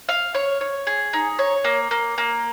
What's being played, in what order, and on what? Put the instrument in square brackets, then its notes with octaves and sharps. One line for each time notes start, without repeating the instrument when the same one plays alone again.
[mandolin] F5
C#5
C#5
G#4
D#4
C#5
A#3
A#3
A#3